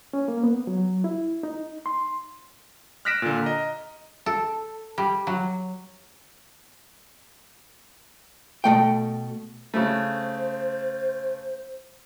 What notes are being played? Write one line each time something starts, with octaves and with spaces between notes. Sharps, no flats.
C#4
A#3
B3
F#3
E4
D#4
C6
F6 F#6 A#6 B6 D7 E7
A#2 D3
D#5 A#5
A4
G3
F#3
B2 G#3 A3 G5
C#3 A3 C5